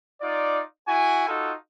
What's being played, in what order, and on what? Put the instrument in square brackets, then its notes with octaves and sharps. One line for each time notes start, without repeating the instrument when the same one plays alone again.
[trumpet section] D#4 F4 D5
E4 F#4 G#5
D#4 F4 F#4 A4